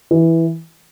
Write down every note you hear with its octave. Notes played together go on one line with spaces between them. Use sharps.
E3